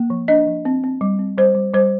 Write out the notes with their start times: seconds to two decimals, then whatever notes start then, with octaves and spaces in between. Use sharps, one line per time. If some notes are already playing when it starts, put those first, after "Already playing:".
Already playing: A#3
0.10 F3
0.28 D4 D#5
0.46 F3
0.65 C4
0.84 C4
1.01 G3
1.19 C4
1.38 G3 C5
1.55 G3
1.74 G3 C5